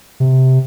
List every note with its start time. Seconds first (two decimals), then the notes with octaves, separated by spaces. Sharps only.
0.20 C3